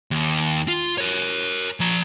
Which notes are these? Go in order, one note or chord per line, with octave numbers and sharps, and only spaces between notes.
D#2
F4
A#4 C#5
F3 A#5